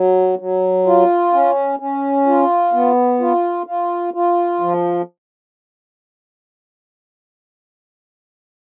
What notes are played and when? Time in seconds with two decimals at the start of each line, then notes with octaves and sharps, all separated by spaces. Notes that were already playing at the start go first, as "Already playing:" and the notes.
Already playing: F#3
0.39 F#3
0.86 F4
1.33 C#4
1.80 C#4
2.27 F4
2.73 B3
3.20 F4
3.66 F4
4.14 F4
4.60 F3